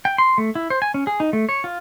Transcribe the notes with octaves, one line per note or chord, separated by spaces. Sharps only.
G5
C6
A3
E4
C5
G#5
C#4
G#4
D#4
A3
C#5
F4